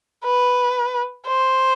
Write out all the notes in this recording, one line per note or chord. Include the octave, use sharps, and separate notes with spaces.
B4
C5